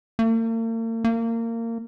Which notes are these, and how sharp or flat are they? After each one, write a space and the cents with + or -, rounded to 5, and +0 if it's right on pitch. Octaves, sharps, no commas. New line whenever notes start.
A#3 -45
A#3 -25